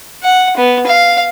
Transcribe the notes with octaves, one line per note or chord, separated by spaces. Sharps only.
F#5
B3
F5